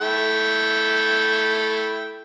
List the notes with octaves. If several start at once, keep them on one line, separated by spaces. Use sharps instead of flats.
A3 E4 G5